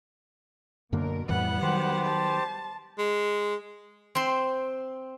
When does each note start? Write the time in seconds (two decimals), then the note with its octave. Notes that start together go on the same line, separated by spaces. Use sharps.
0.92 F#2 B2 D3 A#3 A#4
1.29 F2 A2 E3 G3 B3 F#5
1.62 D#3 F#3 G4 C5
2.05 A5
2.98 G#3
4.15 C4 C5 C6